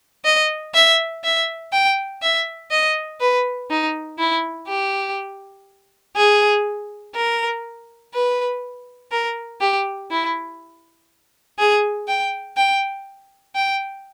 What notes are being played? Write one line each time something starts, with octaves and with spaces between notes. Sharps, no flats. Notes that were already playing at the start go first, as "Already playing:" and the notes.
D#5
E5
E5
G5
E5
D#5
B4
D#4
E4
G4
G#4
A#4
B4
A#4
G4
E4
G#4
G5
G5
G5